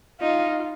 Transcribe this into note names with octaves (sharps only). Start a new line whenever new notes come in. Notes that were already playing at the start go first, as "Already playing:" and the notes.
D#4 F4